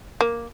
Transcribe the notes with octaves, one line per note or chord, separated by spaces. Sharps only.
A#3